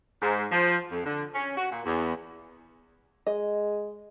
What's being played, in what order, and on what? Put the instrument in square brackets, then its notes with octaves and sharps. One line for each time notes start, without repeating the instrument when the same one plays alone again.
[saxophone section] G#2
F3
F2
D3
C#4
F#4
A#2
E2
[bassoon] G#3 [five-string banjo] D#5